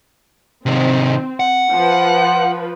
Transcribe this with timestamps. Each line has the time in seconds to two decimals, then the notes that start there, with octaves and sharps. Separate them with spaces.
0.66 C3 D#3 C4
1.40 F#5
1.73 F3 B4